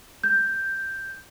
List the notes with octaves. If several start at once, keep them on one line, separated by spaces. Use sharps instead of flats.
G6